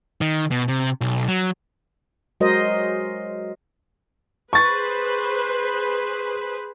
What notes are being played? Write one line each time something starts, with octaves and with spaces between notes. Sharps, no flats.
D#3
B2
C3
B1
F#3
F#3 G#3 F#4 A#4 C5 D#5
G#4 B4 C5 C#6 A6